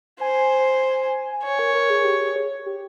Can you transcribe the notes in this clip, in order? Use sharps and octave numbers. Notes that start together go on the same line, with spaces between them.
C5 G#5
C#5 G#5
A#4
A#4
G#4
G4
G#4
C#5
G4